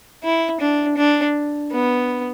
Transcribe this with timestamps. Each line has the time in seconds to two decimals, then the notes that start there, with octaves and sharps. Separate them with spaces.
0.23 E4
0.60 D4
0.97 D4
1.71 B3